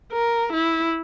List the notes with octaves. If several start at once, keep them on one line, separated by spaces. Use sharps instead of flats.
A#4
E4